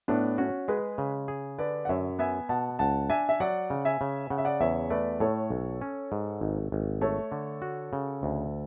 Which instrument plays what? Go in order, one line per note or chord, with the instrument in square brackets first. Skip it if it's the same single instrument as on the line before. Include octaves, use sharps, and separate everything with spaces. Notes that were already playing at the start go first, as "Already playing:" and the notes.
[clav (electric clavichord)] A2 [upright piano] B3 D4
[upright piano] C#4 [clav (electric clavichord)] F#4
[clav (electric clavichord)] G#3 [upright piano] G#4 B4
[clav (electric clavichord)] C#3
G#4
[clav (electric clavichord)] D3 [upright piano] B4 D5
[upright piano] F#5
[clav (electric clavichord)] F#2 [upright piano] C#5 E5
[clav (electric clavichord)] B3 [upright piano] E5 G#5
[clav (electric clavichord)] B2 [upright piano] F#5 A5
[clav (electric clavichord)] C#2 [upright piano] F#5 A5
[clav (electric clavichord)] D4 [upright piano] E5 G#5
[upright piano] E5
[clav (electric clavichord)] F#3 [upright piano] D5 F#5
[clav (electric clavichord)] C#3
[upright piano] E5 G#5
[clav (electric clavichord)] C#3
[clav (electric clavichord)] C#3 [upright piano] F#5
[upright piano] E5
D5 F#5
[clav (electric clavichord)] E2 [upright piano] C#5 E5
[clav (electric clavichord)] A3 [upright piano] B4 D5
[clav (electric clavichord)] A2 [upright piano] A4 C#5
[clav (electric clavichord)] B1
C#4
G#2
G#1
G#1
[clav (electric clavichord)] A3 [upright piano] A4 C#5
[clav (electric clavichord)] D3
F#4
C#3
D2